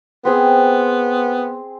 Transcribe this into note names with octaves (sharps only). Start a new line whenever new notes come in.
B3 C4 G#4